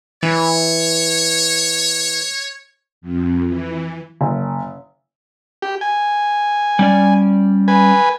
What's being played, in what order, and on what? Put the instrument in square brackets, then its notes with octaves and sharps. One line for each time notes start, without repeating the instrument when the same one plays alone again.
[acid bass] E3 [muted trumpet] C#5
[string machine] F2
E3
[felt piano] F#1
[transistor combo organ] G4
G#5
[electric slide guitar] G3 C#4 D5
[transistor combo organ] B4 G#5